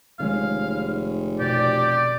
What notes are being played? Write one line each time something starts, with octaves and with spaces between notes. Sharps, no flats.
F1 D#3 G#3 C#4 F5
B2 G4 D5